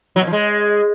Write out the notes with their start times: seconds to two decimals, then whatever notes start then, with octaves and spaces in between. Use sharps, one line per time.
0.16 F#3
0.21 B2
0.27 F3
0.33 G#3